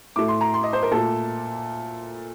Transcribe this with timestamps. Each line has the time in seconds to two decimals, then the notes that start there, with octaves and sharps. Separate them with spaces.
0.16 A2 A3 D6
0.28 C6
0.41 A#5
0.54 C6
0.63 D#5
0.73 C5
0.83 A#4
0.91 A#2 A3 A4